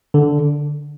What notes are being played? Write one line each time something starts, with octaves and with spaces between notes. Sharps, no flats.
D3